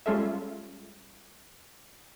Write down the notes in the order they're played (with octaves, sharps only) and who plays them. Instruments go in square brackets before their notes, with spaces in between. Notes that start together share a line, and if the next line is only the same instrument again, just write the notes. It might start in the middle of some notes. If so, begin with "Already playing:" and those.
[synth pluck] G3 G#3 C#4 F4 A4 E5